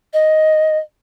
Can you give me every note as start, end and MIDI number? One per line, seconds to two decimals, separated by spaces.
0.13 0.78 75